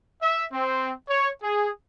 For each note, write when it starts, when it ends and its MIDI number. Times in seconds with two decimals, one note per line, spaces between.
0.21 0.44 76
0.51 0.91 60
1.08 1.28 73
1.41 1.69 68